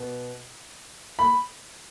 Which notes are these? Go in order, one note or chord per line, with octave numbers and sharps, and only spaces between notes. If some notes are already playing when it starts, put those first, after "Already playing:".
Already playing: B2 B3
B5